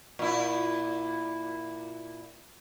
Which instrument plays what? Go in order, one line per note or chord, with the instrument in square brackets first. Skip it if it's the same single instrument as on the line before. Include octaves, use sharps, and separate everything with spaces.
[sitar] A#2 E4